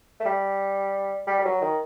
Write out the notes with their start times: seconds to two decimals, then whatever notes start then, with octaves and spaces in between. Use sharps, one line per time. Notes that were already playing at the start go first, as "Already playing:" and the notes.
0.20 A3
0.25 G3
1.27 G3
1.39 G3
1.45 F#3
1.61 D#3